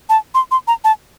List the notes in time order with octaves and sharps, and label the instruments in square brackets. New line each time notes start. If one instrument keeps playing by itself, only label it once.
[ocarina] A5
C6
C6
A#5
A5